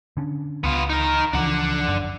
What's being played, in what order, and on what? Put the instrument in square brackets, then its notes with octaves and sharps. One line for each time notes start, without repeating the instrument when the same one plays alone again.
[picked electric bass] D3 C#4 D4
[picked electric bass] C#2 [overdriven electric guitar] B3 F4
[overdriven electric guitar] D#4 A#4
[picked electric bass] C#2 E3 F3 [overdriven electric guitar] D4 F#5
[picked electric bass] G1 F#2